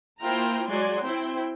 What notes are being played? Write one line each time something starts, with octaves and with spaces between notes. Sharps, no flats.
A#3 E4 F4 C5 G5 A#5
F#3 G#3 F#4 D5 G#5 C6
C4 E4 C5 G5